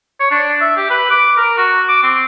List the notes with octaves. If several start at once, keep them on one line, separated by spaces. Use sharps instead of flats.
C#5
D4
E5
G4
B4
D6
A#4
F#4
D6
C4